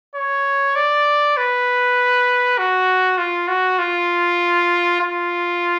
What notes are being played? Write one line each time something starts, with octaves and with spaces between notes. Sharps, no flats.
C#5
D5
B4
F#4
F4
F#4
F4
F4